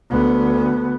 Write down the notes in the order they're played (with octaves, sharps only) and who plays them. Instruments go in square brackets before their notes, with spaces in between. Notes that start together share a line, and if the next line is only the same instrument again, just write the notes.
[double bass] D2 B3